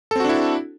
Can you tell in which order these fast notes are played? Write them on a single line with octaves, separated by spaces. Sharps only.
A4 C4 F#4 D4 E4